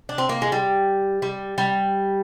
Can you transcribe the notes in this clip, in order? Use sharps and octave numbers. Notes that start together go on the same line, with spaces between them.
D4
C4
A#3
G#3
G3
G3
G3